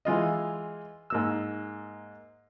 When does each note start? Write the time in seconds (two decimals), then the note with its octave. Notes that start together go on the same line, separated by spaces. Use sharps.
0.05 E3 G#3 F4 D#5
1.10 G#2 A#3 E6